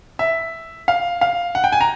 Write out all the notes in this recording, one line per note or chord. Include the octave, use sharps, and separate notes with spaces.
E5
F5
F5
F#5
G5
G#5
A#5